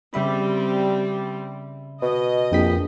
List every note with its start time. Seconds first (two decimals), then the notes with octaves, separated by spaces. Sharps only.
0.14 C#3 G3 C4 E5 B5
2.02 B2 D#5
2.52 A#1 F2 G5 B6